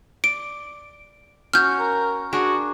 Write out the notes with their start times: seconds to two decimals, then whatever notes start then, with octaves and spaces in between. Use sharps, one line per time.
0.24 D5 D7
1.53 C#4 F#4 C#5 F6 G6
1.79 A#4
2.33 D4 F#4 G#4 A#4